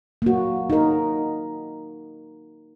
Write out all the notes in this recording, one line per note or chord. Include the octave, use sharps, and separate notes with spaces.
A#3 F#4
D#4 A#4